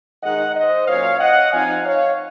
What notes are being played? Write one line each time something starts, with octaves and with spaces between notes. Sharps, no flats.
D#3 G#3 D#4 D#5 F#5
C5 D#5
A#2 F#3 C#4 C#5 F5
D#5 F#5
F3 C4 D#4 F5 G#5
C#5 F5